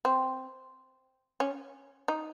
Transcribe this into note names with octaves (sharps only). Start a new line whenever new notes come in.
C4
C#4
D#4